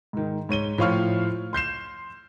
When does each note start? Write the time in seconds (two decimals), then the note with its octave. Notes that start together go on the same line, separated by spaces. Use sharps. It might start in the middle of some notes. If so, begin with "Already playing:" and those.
0.13 G#2 D#3
0.49 G#2 C#5 D#7 G7
0.78 A2 F3 C#5 F5 C#6 F6
1.53 C6 G6 C7 E7